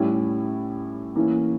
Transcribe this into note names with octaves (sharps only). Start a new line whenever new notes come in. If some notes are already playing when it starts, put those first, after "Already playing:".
Already playing: A2 G3 C#4 E4
E3 A#3 C#4 E4